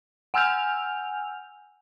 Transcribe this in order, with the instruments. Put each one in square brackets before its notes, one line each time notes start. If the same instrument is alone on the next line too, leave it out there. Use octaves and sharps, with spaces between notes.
[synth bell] F#5 G#5 E6 F6 G6 F7